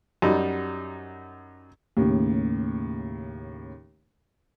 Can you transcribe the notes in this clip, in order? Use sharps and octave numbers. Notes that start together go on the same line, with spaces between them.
F#2 G3 D#4
D#2 A2 C#3